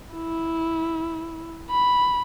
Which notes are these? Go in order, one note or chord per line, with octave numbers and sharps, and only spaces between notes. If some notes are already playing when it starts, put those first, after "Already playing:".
E4
B5